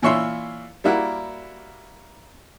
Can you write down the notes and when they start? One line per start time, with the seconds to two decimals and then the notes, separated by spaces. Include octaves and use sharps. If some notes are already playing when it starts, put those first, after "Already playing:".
0.02 A#2 E3 F4 C#5 E5 C6
0.84 G3 A#3 E4 F#4 A#4